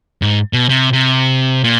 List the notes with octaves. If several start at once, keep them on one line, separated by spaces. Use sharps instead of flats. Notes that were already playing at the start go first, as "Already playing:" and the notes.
G#2
B2
C3
C3
A#2